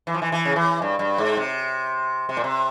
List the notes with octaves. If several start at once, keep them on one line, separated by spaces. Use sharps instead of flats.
E3
F3
E3
E3
C#3
E3
G2
G2
G#2
C3
C3
A#2
C3